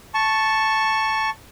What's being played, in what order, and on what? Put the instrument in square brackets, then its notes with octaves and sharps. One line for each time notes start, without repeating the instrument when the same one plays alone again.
[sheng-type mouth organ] A5 C#6